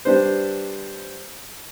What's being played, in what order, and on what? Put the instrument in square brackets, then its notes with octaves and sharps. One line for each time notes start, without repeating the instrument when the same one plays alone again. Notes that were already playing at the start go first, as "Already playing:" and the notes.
[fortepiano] G3 D4 B4 C5